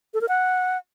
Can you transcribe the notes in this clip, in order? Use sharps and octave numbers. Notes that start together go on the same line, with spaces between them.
A4
A#4
F#5